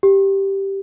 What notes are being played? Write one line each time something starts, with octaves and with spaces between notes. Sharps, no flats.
G4